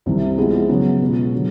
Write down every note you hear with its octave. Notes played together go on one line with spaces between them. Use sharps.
C2 C3 E3
F3 G#3 B3 E4 G#4
C#3 F#3 B3
B2 G#3 C#4 F4
D3 F#3